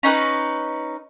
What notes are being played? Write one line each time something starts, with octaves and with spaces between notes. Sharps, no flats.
C#4 D#4 A#4 B4